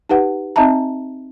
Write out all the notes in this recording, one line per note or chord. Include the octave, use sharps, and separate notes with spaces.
D#4 G4 B4 F#5
C4 D#4 D#5 E5 A5 A#5